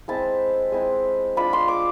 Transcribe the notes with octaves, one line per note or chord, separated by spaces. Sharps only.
G#3 C4 E4 A5
G#3 C4 E4
G#3 D4 F4 B5
C6
D6